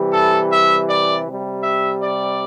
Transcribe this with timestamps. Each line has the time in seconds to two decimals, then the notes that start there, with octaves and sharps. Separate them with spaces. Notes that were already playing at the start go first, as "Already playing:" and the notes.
Already playing: C3 E3 G3
0.13 A4
0.51 E5
0.88 D5
1.26 C3 G3
1.64 E5
2.01 D5